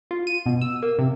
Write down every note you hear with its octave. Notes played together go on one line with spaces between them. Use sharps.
F4
D#7
B2
E6
A#3
C3